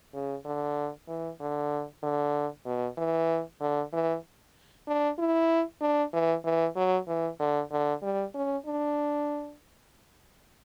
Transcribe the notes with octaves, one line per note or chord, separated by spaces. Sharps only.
C#3
D3
E3
D3
D3
B2
E3
D3
E3
D4
E4
D4
E3
E3
F#3
E3
D3
D3
G3
C#4
D4